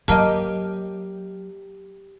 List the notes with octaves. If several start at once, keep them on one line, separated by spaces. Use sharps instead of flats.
F#3 A#3 G4 D#5 G5 A5 F6